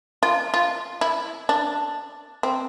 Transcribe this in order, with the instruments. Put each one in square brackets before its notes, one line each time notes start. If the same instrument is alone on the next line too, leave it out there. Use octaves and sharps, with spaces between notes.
[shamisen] F4
F4
E4
D4
C4